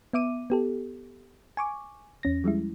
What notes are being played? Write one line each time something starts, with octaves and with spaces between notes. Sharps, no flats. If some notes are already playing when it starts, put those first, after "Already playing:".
B3 E5 D6 D#7
B3 G4 A4
G#5 C#6 D6
E2 C#4 A#6
F3 G3 G#3 E4